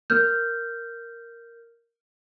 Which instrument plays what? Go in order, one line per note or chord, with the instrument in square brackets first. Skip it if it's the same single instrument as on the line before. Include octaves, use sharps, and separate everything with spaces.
[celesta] A#4 F6 G6